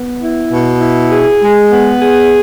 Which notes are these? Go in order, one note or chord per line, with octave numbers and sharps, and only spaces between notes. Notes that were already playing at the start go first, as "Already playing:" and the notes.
Already playing: B3
E4
B2
E4
G#4
G#3
B3
G#4